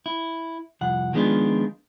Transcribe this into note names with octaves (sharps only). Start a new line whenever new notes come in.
E4
C2 F2 F#5
D#3 F3 G#3 B3 D4 F4